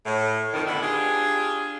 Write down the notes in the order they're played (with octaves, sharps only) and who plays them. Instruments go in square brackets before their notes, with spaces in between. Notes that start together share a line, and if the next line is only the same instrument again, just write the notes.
[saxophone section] A2
F2 D#3
A2 D3 B3 D4 E4
D4 F4 G4 G#4